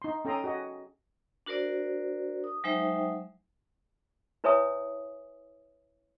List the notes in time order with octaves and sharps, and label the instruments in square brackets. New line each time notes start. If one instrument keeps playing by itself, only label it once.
[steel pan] D#4 C6
C#4 A4 G5 A#5 C6 D#6
F#4 G#4 D#5 F#5
[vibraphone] D4 F#4 A#4 C5 D5
D#6
F#3 G#3 D#4 C5 E5 G5
[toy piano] E4 B4 C#5 E5 G#5 D#6